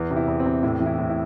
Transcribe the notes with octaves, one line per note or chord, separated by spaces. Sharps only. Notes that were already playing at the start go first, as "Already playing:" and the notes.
Already playing: E2 E3
C3
E4
E2
C4
C3
A2 E4
E3
E4
A2
E4